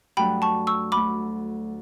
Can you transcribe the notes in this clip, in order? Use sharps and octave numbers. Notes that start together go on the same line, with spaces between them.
G2 F#3 A3 D4 F#4 G5 B5
A5 C#6
C#6 E6
D2 D3 A3 B5 D6